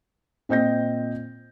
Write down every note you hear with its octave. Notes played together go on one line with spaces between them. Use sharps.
A#2 C4 D#5 G6 A#6